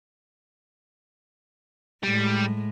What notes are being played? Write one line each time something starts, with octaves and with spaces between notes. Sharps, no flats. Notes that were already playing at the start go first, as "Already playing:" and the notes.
A2 G3 G#3